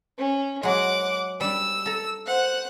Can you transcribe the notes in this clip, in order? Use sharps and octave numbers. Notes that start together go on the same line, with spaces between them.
C#4
F#3 G#3 F#5 D6
G3 D4 E6
A4 A#5
C5 F#5